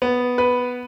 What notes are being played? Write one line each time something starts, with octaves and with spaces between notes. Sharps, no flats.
B3
B4